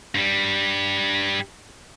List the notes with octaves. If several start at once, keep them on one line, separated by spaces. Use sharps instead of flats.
G2 G3